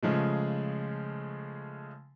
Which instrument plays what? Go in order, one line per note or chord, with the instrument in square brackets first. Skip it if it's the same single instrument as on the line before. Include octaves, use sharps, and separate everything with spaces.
[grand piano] C#3 F3 G#3 A3